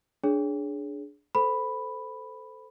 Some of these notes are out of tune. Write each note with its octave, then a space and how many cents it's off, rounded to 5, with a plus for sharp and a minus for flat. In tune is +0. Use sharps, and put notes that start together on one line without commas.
D4 +0 G#4 +10 C#5 +5
A4 +0 C5 -20 B5 +0